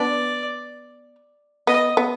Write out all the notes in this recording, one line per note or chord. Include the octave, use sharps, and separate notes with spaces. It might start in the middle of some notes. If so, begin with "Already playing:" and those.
Already playing: B3 D4 D5
B3 D#5
B3